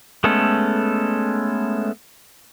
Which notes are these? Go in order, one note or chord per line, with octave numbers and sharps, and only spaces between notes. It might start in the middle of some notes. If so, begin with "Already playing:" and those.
G#3 A3 B3 C#4 A4